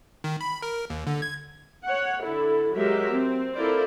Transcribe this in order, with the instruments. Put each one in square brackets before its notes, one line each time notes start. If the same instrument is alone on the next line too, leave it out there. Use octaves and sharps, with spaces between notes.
[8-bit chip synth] D#3
B5
A#4
D#2
D3
G#6
[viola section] C#5 F#5
D3 E4 A4
F#3 G#3 G4 A#4 E5
C4
E4 F4 A4 A#4 C5 D5